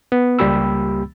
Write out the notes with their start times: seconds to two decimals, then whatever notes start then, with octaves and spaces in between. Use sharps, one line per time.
0.12 B3
0.39 C#2 G3 A#3 G4 B5 E6